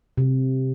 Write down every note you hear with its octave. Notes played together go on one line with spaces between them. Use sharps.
C3